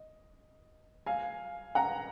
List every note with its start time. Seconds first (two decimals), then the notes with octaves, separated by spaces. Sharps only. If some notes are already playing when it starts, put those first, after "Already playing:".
Already playing: D#5
1.06 F5 G#5
1.75 F#5 A#5